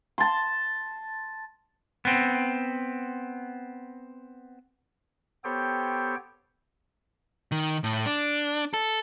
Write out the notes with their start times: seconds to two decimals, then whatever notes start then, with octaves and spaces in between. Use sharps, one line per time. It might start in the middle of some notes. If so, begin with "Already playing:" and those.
0.18 A5 C6
2.05 B3 C4
5.44 B3 G4 A4 C5 C#5 G5
7.52 D#3
7.84 A2
8.06 D4
8.74 A4